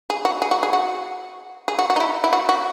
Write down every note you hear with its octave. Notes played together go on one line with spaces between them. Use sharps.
G#4
F#4
G#4
F#4
G#4
F#4
G#4
F#4
F#4
D#4
E4
E4
F#4
F#4